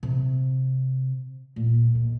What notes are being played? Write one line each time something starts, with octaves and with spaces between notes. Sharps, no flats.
C3
A#2
B2